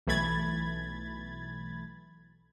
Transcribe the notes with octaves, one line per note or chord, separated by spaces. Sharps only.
B1 E3 A3 B5 G#6 A6